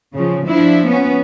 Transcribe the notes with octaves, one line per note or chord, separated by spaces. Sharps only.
C#3 F3
F3 D4 E4
B3 C#4